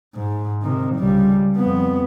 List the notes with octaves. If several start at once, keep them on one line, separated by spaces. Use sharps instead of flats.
G#2
C3 D#3
C#2 G3
F2 B3